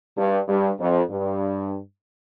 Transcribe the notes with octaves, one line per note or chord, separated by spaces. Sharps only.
G2
G2
F2
G2